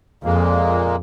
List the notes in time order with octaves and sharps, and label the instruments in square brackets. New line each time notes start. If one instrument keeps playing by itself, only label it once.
[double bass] F2 [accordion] A#2 G#3 A#3